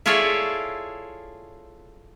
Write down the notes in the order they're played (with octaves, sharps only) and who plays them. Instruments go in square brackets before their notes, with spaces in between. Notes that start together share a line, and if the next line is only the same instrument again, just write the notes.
[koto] E4 F4 G#4 A4 C#5 D5